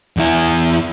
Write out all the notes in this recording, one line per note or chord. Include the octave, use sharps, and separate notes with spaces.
E2 E4